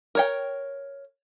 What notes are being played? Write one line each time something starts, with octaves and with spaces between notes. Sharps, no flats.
A#4 C#5 G5